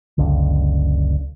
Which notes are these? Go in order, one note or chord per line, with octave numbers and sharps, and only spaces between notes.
F#1 C#2 D3